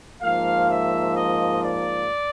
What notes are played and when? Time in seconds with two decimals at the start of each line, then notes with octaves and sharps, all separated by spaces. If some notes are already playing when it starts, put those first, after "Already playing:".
0.21 G#2 F3 A#3 F5
0.68 E5
1.15 D#5
1.61 D5